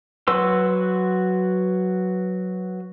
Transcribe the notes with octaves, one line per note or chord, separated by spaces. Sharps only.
F#3 F#4 B4 C6 E6